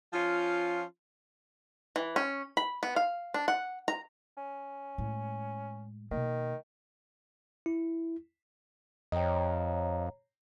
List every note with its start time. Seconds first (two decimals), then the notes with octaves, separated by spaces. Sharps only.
0.13 F3 C#4 F4
1.96 E3
2.16 C#4
2.57 B5
2.83 B3
2.96 F5
3.34 D4
3.48 F#5
3.88 A#5
4.37 C#4
4.98 A2 G#3
6.11 B2 D#3 A#3
7.66 E4
9.12 F2 C#5 D#5 G5 A#5